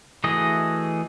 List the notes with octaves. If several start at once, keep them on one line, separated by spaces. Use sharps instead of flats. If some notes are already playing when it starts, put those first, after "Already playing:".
E3 A3 F#4 G#4 D#5